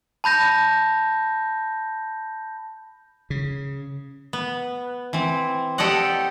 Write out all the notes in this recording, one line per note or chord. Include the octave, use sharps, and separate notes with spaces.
A5 B5 G6 A#6
C#3
B3
E3 C4
G4 A4 D5 D#5 F#5